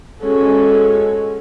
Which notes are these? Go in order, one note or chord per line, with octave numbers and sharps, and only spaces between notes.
G#3 C#4 F#4 A4